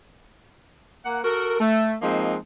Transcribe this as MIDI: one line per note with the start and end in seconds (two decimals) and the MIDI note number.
1.05 1.19 58
1.05 1.19 78
1.24 1.57 66
1.24 1.57 69
1.24 1.57 70
1.60 1.95 57
2.02 2.36 53
2.02 2.36 56
2.02 2.36 58
2.02 2.36 60
2.02 2.36 63